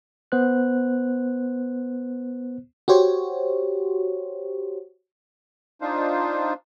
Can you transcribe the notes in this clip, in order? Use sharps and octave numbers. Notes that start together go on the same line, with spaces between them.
B3 C5 F#6
F#4 G4 C5 C#5
D4 D#4 F4 C5